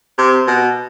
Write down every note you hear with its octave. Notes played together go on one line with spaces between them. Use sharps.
C3
B2